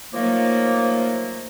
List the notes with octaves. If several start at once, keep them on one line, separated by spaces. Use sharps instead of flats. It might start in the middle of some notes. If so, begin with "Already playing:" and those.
D#3 F3 F#3 A3 A#3